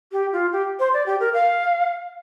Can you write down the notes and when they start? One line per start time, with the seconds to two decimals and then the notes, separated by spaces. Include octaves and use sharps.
0.12 G4
0.32 F4
0.52 G4
0.79 C5
0.94 D5
1.06 G4
1.20 A#4
1.34 F5